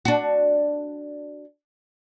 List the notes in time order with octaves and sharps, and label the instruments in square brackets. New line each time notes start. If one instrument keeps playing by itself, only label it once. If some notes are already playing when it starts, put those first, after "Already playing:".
[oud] D4 F#4